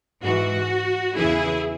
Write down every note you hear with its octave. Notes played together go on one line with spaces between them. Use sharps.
G#2 E3 F#4
E2 C#3 E3 E4 G#4